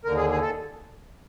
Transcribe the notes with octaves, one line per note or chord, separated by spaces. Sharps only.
D#2 D3 A#4
G#4
G#4
A4